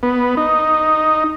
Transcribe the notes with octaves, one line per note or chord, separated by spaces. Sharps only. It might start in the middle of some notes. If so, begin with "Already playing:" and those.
B3
D#4